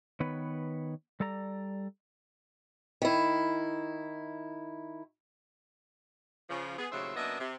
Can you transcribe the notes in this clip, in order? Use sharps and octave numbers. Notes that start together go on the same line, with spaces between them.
D#3 B3 B4 C#5
G3 A4 D5 A#5
D#3 E4
C#3 F3
B3 G#4
D#2 A2 C#3 F#3 C5 E5
F#2 A#3 B3 D4 D#5 E5
C3